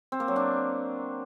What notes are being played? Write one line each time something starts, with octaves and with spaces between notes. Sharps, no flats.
C4
A#3
F#3
D4